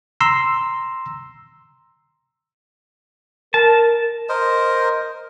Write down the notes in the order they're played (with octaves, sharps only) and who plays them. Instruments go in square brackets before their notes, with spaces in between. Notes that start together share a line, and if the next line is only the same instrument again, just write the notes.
[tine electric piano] A#5 C6 E6
[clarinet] A#4 [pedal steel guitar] A5
[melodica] A#4 C5 D#5